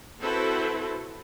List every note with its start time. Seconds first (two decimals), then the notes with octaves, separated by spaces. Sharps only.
0.21 C4 E4 F#4 A4 B4 C5